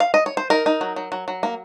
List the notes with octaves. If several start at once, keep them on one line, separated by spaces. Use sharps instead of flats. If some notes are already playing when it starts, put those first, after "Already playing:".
F5
D#5
C#5
C5
D#4 A#4
D#4
F#3
F#3
F#3
F#3
A#3